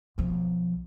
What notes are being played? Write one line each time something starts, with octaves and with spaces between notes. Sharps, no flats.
B1 F3